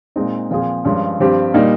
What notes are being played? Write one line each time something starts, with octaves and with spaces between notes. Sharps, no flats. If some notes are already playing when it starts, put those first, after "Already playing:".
A#2 G#3 C4 D#4
A#2 F3 C4 F4 G#4
G2 F3 G#3 C#4 F4
G2 F3 C4 G4 C5
A#2 G3 A#3 D#4